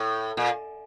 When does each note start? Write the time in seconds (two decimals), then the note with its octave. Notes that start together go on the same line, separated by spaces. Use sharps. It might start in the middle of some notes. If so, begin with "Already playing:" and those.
Already playing: A2
0.37 A#2